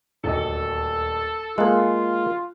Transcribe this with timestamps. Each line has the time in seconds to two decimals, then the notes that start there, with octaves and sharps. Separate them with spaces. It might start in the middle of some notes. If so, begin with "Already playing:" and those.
0.24 D#1 D2 A4 D#5
1.58 G#3 A#3 F4 G#4 C6 F#6